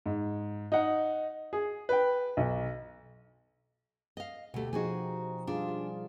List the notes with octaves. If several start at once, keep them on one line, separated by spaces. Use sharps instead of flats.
G#2
D#4 F#5
G#4
B4 G5
B1
D#5 F5
D2 B2 A3 G4
F3 D#4 F#4 G#4 G#5
G3 D4 F4 G#4
G#4